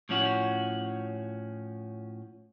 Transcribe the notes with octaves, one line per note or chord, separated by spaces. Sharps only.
A2 F3 C#4 F#4